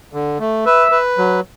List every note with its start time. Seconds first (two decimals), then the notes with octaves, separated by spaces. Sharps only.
0.13 D3
0.40 A3
0.66 B4 E5
0.91 B4
1.18 F#3